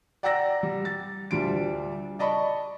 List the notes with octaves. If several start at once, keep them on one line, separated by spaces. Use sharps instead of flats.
D5 F#5 G5 A#5 E6 A#6
G3
A6
D2 G3 D4 F4 D7
D5 D#5 A5 B5 C#6